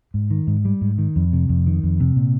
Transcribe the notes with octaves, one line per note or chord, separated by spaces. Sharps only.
G#2
D#3
G#2
G3
G#2
D#3
F2
C3
F2
D#3
F2
C3
A#2